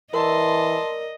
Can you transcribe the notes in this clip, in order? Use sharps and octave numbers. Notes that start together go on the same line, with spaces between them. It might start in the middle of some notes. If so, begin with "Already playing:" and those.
E3 A#4 D5 D#5 A5 C6